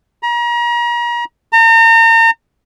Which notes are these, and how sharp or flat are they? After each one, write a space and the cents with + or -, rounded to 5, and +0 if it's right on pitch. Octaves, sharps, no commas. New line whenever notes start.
A#5 +35
A#5 -40